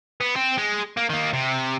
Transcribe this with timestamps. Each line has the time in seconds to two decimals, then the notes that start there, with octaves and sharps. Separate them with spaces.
0.21 B3
0.36 C4
0.58 G#3
0.97 A#3
1.10 D#3 A#3
1.33 C3